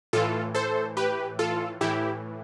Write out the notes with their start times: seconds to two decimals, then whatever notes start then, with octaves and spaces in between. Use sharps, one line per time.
0.13 A2 E3 F4 A4
0.55 A4 C5
0.97 G4 B4
1.39 F4 A4
1.81 A2 E3 E4 G4